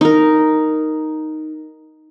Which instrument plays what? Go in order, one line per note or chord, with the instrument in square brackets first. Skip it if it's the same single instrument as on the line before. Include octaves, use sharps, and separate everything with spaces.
[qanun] D#4 A#4